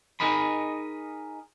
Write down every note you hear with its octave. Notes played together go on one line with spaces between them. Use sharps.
D#4 G#4 A#4 D#5 B5